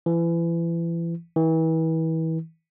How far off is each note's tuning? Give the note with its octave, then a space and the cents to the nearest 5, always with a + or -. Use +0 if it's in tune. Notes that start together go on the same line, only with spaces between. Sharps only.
E3 +30
E3 -35